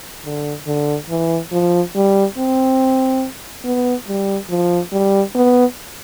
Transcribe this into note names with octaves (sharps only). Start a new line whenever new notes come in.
D3
D3
E3
F3
G3
C4
B3
G3
F3
G3
B3